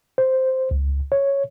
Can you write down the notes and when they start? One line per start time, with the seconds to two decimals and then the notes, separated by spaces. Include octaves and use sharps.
0.18 C5
0.71 C#2
1.12 C#5